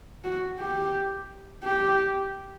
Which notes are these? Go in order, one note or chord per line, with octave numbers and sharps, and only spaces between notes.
F#4
G4
G4